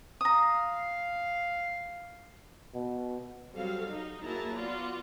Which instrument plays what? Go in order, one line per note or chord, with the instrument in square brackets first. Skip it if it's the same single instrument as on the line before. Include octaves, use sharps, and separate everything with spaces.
[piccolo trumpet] F5 [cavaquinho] A#5 D#6
[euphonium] B2
[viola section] F#3 G3 C4 F#4 A4 F5
D#4
F#3 A#3 E4 G#4 A5 A#5
B3 F4 F#4 D5